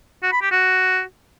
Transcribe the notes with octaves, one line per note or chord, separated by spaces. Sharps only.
F#4
B5
G4
F#4